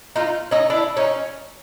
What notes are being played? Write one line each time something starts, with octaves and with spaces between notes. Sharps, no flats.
D#4 F4
C#4 D#4
D4 E4
C#4 D#4